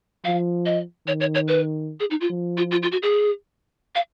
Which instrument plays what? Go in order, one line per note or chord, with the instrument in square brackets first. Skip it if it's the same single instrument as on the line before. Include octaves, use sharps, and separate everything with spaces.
[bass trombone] F3 [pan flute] F5
[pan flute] D#5
[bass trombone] D#3 [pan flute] C#5
[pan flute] C#5
C#5
B4
G#4
D#4
F4
[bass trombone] F3
[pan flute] F4
F4
F4
F#4
G#4
F5